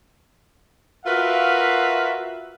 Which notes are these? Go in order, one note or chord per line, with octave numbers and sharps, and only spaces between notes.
F4 F#4 A#4 B4 E5 F5